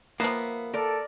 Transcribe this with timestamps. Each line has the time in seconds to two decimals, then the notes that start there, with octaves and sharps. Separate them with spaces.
0.20 F3 A#3 B3 E5
0.74 A4 A#4 D5